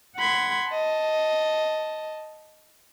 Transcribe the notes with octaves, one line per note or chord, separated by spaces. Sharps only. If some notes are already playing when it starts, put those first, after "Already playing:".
F#5 B5 C6 G#6
D#5 A5